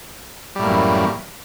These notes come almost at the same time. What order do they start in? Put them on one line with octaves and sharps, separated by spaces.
G3 A2 A#3 F#2 E3